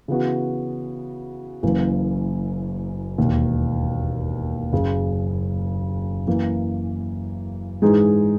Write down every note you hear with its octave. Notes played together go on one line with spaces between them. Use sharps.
C#3 E3 B3 F#4
F#1 F#2 E3 A#3
E1 D#2 D#3
F#1 F#2 C#3
F#2 E3 A#3
G#2 E3 G#3 D#4 G#4